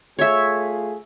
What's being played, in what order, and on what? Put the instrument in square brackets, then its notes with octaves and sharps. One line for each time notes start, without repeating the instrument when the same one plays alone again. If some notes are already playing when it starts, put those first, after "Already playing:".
[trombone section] A3 F4 G#4 [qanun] C#5 E5